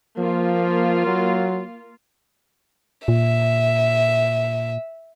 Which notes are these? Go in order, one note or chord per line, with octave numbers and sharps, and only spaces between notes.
F3 A#3 F4
F#3
A#2 E5